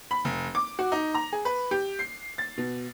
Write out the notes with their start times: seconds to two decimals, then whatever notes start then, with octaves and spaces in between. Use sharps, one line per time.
0.11 B5
0.25 F1
0.55 D6
0.79 F#4
0.92 D#4
1.14 A#5
1.33 G#4
1.45 B4
1.71 G4
1.99 C7
2.38 A6
2.58 B2